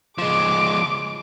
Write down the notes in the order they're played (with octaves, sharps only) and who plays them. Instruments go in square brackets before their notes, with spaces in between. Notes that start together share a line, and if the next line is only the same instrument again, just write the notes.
[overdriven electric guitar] F3 G#3 [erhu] D6